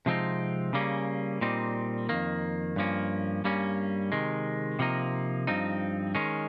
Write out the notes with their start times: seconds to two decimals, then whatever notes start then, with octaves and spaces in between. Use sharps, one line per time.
0.06 C3 F3 G#3 C4 D#4
0.73 C#3 G3 A#3 C#4
1.41 A#2 G3 C4 D#4
2.09 F2 D#3 A#3
2.76 G2 F3 A#3 C#4
3.44 G2 G3 A#3 C#4
4.12 C3 D#3 G#3
4.79 C3 F3 A#3 D#4
5.47 G2 F3 C4 D#4
6.15 D#3 G#3 C#4